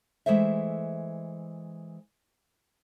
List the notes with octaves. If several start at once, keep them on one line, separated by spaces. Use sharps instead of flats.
E3 G#3 A3 C5 E5